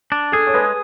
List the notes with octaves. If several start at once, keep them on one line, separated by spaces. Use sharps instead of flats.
D4
G#4 A4
C#5
G#3 B4